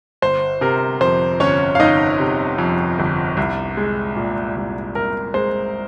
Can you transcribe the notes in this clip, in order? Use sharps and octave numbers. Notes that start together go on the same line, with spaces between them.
G1 C5
C3 A#4
F2 C5
G1 C#4 C#5
F5
G1 D#4 D#5
C3
F2
G1
C2
G#3
A#2
C2
C2 A#4
G#3 C5